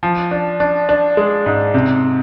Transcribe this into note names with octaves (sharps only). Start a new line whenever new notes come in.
F3
D4
D4
D4
G#3
G#2
C3